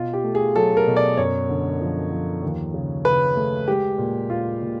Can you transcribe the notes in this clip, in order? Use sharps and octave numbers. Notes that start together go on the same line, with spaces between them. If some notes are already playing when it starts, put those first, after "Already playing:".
Already playing: B2 F4
G4
A3
G#4
F#3 A4
A#4
B2
D5
F#2 C#5
D3
F3
F3
D#2
C#3
C#3 B4
A3
G#3 G4
A#2
A#2 F4
A#2